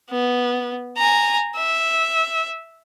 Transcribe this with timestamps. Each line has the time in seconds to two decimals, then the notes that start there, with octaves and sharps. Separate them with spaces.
0.11 B3
0.97 G#5 A#5
1.57 E5